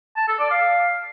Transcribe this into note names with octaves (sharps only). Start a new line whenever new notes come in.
A5
A4
D5
F5